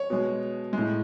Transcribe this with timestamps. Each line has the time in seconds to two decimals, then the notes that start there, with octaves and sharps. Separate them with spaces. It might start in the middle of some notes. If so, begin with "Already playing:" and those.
Already playing: C#5
0.10 B2 G#3
0.73 A2 G#3